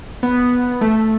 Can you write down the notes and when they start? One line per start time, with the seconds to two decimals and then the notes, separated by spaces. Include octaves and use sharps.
0.23 B3
0.81 A3